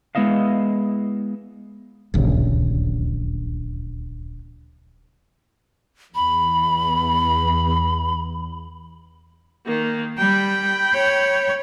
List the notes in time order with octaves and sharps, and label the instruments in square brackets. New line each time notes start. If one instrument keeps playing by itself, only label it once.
[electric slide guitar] G#3 B3 E4 D#5 F5
[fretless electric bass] D1 A#1 D#2 C#3
[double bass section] E2 [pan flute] B5
[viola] D#3 A#3
[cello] G3 [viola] G5 B5
[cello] C#5